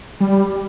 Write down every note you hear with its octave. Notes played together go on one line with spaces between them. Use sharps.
G3